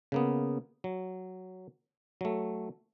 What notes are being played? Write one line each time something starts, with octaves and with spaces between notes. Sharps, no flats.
C#3 A#3 B3
F#3
F#3 A3